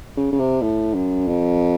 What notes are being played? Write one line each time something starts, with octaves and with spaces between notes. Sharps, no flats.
C#3
C#3
C3
A2
F#2
F2